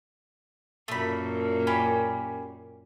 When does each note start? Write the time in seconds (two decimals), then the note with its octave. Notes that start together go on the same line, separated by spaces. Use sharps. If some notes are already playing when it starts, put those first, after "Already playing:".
0.88 F#2 A#2 A3 B5
1.67 C#4 G4 B5